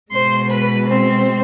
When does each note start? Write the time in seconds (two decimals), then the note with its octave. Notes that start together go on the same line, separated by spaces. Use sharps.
0.12 B2 G#3 C5 C6
0.50 B4 B5
0.88 C4 C5